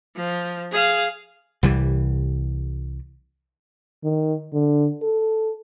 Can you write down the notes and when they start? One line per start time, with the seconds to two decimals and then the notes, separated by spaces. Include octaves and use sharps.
0.16 F3
0.71 G#4 F5
1.63 C2 E3 G3
4.04 D#3
4.53 D3
5.03 A4